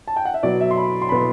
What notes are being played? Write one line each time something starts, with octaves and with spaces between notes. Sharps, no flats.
A5
G5
F#5
E5
B2 F#3 B3 D5
E5
C6
B5
C6
B5
B2 F#3 B3 C6